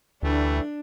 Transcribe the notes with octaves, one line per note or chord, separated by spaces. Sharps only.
D2 E3 G3 A3 D4